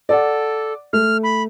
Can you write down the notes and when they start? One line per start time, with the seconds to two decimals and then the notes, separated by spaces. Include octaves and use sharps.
0.09 A4 D5 F#5
0.93 A3 F6
1.23 B5